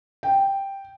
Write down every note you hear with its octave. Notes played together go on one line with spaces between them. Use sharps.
G5